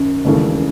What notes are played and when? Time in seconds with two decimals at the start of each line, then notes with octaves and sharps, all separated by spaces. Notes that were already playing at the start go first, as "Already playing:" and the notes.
Already playing: G#1 F#2
0.25 E1 D#2 C#3 E3 A3